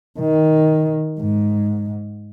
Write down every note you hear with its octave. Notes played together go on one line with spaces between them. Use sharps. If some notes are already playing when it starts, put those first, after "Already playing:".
D#3
G#2